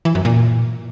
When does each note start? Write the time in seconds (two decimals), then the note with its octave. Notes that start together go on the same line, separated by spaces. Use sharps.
0.05 E3
0.15 F#2
0.25 A#2